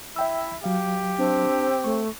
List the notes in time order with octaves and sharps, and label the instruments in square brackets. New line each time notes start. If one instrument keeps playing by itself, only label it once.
[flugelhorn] E4 [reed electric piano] E5 G5 E6
[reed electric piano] F#3 F5 [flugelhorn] G4
[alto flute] C4 [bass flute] D4
[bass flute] A3 [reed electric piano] C#6